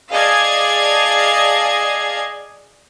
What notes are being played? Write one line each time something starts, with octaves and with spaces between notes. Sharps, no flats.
G#4 D5 D#5 F5 A5 G#6